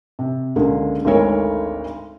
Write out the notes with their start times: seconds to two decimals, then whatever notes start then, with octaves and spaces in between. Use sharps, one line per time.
0.19 C3
0.56 C#2 D3 A#3 G#4
1.05 G#1 D2 G#3 A3 A#4 C#5